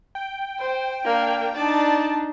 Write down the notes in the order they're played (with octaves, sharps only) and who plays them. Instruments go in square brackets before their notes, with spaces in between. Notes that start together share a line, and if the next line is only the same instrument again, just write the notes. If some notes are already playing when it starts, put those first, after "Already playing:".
[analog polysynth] G5
[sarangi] C5
[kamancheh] A#3 [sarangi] D4
[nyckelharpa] D4 D#4 [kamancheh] D5 [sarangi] A5